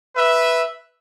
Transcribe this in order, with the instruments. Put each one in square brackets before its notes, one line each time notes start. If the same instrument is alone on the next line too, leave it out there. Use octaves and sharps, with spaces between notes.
[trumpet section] B4 E5